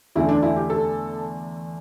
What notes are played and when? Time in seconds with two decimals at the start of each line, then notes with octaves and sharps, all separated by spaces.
0.16 E2 D3 A3 E4
0.29 D4
0.43 E4
0.56 G4
0.70 A4